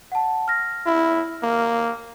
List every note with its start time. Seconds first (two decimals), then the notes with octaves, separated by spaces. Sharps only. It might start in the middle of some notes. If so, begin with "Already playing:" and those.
0.12 F#5 A5
0.48 F6 A#6
0.86 E4
1.43 A#3